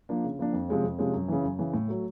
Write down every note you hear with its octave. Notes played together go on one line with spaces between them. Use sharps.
F3 A#3 D4
C#3
F3 A#3 D4
F2
C3 F3 G#3 C#4
F2
C3 F3 G#3 C#4
F#2
C#3 E3
F#2
C#3 E3
A2
F#3 A3